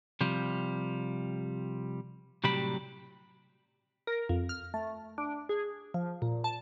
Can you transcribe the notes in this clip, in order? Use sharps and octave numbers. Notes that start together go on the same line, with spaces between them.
C3 F3 G3
A2 C3 F#3 G3 G4 B5
A#4
F2
F6
A3
D4
G#4
F3
A#2
A5